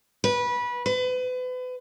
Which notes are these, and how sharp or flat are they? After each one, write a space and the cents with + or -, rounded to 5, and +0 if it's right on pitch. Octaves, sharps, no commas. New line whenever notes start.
B4 -20
B4 +35